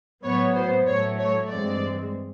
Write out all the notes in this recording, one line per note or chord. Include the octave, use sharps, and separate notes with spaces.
A2 F#3 B3 C#5
C5
A2 F#3 A3 C#5
C#5
G2 E3 G#3 C4 D5